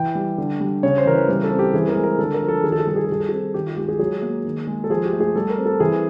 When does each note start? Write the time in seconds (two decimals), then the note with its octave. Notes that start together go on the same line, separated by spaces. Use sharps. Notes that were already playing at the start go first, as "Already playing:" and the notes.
Already playing: E3 G5
0.15 G3
0.38 D3
0.60 G3
0.83 C#3 C#5
0.98 C5
1.06 E3 A#4
1.13 B4
1.28 G3 A#4
1.44 A4
1.51 C4
1.59 G4
1.74 E3 G#4
1.89 A#4
1.96 G#3
2.04 A#4
2.19 D3 A4
2.34 A#4
2.42 F3
2.48 A4
2.64 D#3 G#4
2.72 A4
2.80 G#4
2.87 G3 A4
2.96 G#4
3.05 A4
3.10 G3 G#4
3.20 A4
3.29 C4 G#4
3.54 D#3 G4
3.66 F4
3.77 G#3 G4
3.88 G#4
3.99 F#3 G#4
4.22 A#3
4.45 D#3
4.67 G#3
4.84 A4
4.90 F3 G#4
5.05 G4
5.13 A3
5.20 G#4
5.35 G3 A4
5.50 A#4
5.58 C4
5.66 A4
5.80 E3 G#4